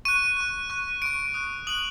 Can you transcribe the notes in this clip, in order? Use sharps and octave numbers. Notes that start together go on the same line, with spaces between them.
C#6 F#6 D#7
C#6 F#6
C#6 F#6
C#6 F#6 D7
D#6 F#6
D#6 F#6 F#7